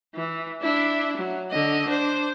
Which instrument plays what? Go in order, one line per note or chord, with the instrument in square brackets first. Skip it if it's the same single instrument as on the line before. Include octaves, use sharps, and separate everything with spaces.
[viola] E3
D4 E4
F#3
D3 D#5
D4 C5